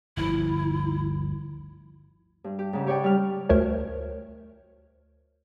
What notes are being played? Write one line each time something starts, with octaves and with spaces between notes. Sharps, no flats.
G1 D2 F3 E4
G2
G4
G#2 C#3
G4 C#5 D5 G5
G3 F6
D2 A3 A#4 C5 C#5